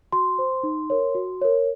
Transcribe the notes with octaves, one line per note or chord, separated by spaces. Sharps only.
F#4 C6
C5
D#4
A#4 C#5
F#4
A#4 C#5